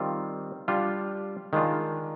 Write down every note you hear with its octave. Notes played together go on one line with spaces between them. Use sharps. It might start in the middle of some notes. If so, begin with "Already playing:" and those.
Already playing: D#3 G3 C4 F4
G3 D4 F4
D#3 G#3 D4 F4